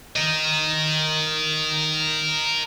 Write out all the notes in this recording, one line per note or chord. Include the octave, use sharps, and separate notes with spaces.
A#4 D#5